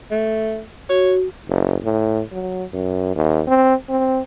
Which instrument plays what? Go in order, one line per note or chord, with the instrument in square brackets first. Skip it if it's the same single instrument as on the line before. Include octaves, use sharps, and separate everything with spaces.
[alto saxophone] A3
[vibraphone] F#4 [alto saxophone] C#5
[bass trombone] F#1
A2
F#3
F#2
D#2
C4
C4